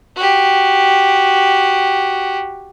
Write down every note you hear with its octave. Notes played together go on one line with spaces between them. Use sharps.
F#4 G4